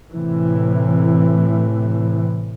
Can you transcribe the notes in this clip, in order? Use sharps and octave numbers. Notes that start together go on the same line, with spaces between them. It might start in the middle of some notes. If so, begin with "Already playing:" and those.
A2 C3 E3